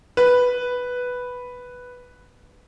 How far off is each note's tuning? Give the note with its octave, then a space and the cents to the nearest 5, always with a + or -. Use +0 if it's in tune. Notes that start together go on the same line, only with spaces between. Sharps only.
B4 +0